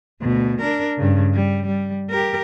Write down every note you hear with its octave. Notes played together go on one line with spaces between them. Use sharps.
D2 B2
D4 A#4
G2 C#3
G3
G3
G4 A#4